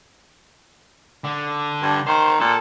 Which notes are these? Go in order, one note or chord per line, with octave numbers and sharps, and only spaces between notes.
D3
G2
D#3 C5
A#2 A4